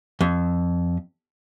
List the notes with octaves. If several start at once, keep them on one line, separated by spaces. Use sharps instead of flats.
F2